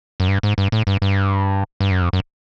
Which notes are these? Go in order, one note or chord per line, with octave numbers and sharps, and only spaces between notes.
F#2
G2
G#2
G2
A2
G2
G2
G2
F#2
F2
F#2